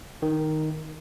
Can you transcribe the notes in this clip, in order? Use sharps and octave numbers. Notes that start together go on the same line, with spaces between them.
D#3